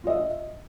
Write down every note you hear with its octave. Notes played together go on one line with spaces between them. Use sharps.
F4 D#5 E5